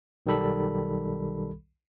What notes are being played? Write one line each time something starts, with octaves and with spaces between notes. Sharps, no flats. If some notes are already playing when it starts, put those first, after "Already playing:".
B1 D#3 G3 A4 B5